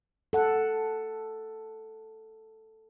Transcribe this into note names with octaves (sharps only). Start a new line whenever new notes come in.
A4 F#5